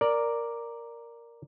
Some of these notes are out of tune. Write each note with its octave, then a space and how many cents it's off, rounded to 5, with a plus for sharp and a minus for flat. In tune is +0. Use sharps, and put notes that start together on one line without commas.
A#4 +0 D5 +0